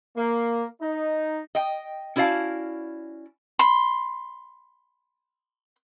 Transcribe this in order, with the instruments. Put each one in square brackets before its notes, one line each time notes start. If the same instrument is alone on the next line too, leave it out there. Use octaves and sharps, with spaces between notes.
[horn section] A#3
D#4
[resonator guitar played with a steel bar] D#5 G5
C#4 E4 F#4 D5 F5 A5
[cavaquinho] B5 C6